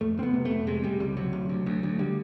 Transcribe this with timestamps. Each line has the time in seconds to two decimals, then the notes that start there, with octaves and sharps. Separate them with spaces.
0.01 F2 A3
0.18 F#1 C4
0.23 B3
0.34 C3
0.45 A3
0.51 F2
0.67 C3 G#3
0.83 C3 G3
1.00 C#2 G3
1.17 C3 F#3
1.33 D2
1.49 D2
1.66 D2
1.83 D2
1.99 D3 G3